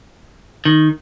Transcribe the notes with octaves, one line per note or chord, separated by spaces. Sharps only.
D#3